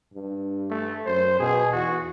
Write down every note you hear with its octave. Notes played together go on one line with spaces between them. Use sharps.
G2
A3
F#2 C5
B2 G#4
E2 F#4